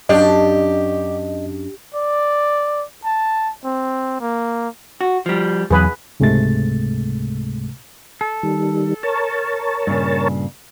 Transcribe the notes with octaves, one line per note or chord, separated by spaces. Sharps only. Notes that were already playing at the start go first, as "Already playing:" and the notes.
F#2 D4 G4 D#5 F5
D5
A5
C4
A#3
F#4
F3 G3
B1 E2 E3 F#3 G#4 B4
C#2 G#2 C3 G#3 A3 A6
A4
D#3 G3
A#4 C#5 A5
G2 A#2 C#3